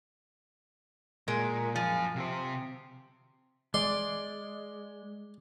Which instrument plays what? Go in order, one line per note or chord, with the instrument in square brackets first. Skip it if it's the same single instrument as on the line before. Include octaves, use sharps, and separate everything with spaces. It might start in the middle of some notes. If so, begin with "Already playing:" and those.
[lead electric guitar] A#2 [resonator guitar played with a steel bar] G#3 A#4
[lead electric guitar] F#2 G#5 [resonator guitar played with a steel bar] F3
[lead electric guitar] C3 C5
[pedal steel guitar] G#3 [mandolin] D5 [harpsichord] C6